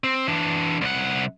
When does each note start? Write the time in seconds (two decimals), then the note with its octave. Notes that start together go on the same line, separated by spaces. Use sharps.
0.04 C4
0.28 E3 D4
0.81 C2 F#5